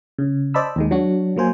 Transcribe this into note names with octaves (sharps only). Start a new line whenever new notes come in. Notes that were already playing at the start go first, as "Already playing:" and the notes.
C#3
C5 D5 D#5 A5 B5 E6
D#2 D#3 G#3
F#3 D4 F#4
F#3 A#3 C5 G#5